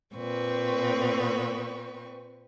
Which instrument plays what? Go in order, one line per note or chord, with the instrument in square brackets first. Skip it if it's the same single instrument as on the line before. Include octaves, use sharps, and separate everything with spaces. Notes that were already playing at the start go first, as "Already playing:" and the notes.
[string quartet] A#2 C4 B4 C#6